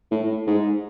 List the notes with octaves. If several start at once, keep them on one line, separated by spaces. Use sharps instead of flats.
A2
G#2